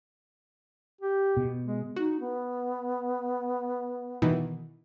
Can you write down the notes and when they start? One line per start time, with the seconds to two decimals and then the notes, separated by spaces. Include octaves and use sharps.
1.01 G4
1.37 B2
1.66 G#3
1.96 D#4 F#4
2.20 B3
4.22 B2 D#3 E3